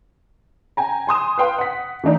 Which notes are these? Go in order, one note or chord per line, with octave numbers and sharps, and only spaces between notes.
G5 G#5 A#5
G#5 C6 D#6 E7
B4 F5 G5 C6
F#5 B6
E3 A3 D4 D#4